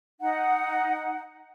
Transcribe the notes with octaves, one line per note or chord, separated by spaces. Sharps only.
D#4 F#5